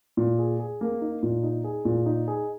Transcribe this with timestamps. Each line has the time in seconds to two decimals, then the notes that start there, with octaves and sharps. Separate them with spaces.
0.17 A#2
0.39 G#4
0.59 G#4
0.81 A#3
1.01 D#4
1.23 A#2
1.43 D#4
1.64 G#4
1.85 A#2
2.06 D#4
2.28 G#4